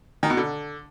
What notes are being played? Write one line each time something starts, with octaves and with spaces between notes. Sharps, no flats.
D#3
B2
D3